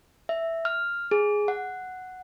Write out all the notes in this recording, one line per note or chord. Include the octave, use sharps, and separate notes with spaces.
E5
F6
G#4
F#5